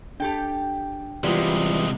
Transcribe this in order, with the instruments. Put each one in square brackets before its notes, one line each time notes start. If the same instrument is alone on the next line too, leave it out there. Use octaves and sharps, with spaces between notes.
[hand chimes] D4 [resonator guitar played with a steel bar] G4 A4 G5
[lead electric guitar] C3 G#3 [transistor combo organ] E3 G3 [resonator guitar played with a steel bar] B3 [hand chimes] F4 D5